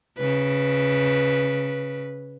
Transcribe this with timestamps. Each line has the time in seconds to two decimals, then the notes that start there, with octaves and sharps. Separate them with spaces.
0.18 C#3 B4